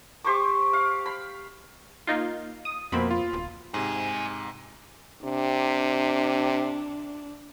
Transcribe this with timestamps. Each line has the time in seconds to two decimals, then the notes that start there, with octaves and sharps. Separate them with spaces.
0.24 G4 C5 C#6 D6
0.73 F5
1.06 B5
2.07 A#3 D#4 F4
2.65 D#6
2.92 F2 B2 A#3 C4 B5
3.11 F4
3.33 D1
3.74 G#2 C3 D#4 G#4
5.25 C3 D4